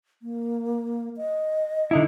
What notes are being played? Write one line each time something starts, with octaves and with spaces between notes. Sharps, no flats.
A#3
D#5
D3 D#4 E4